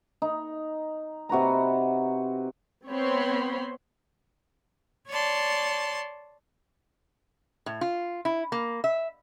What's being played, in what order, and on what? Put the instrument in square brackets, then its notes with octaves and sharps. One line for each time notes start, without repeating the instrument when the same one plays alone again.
[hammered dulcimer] D#4
C3 F#4 B4 A#5
[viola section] B3 C4 C5 C#5 B5 C6
[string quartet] C#5 D5 A5 C6
[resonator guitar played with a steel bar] A2
F4
E4
A#3
E5